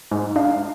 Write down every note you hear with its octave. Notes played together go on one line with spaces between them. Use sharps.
G#2
D4 F5